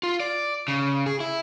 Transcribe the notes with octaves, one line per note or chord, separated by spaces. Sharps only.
F4
D5
C#3
G#4
E4